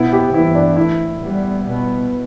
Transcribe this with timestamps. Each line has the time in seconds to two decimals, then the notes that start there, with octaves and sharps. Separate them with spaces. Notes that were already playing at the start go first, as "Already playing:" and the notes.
Already playing: B2 B3 E4
0.12 G4
0.34 G2 E3 B3 E4
0.55 D4
0.77 A2 A3 E4
1.20 A2 G3 B3
1.62 B2 B3